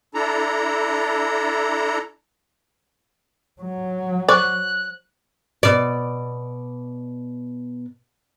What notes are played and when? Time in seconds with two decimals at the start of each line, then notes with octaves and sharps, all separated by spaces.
0.14 D4 E4 A4 A#5
3.62 F#3
4.29 C5 D5 C#6 F#6
5.63 B2 D5